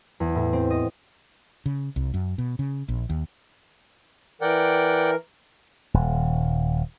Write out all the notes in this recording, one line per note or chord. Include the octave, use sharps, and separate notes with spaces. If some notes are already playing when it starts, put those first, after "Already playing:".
E2
A2
C4
D#5
C#3
C2
F#2
B2
C#3
A#1
D#2
E3 A#4 D5 F#5 G5
D#1